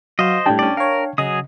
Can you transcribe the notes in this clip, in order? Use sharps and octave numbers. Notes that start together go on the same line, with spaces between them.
F#3 F#4 C5 D#5 F5
A2 G3 D4 G5 A5
C#4 D5
A#4 C#5 F5
C#3 F#3 G#4 D#5 D#6